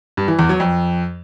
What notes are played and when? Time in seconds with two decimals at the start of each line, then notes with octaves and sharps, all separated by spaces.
0.17 G2
0.28 E3
0.39 E2
0.49 F#3
0.60 F2